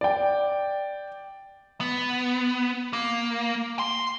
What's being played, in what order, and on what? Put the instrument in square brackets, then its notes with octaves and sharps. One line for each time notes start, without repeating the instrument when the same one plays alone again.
[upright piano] D5 G5
[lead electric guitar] B3
A#3
C6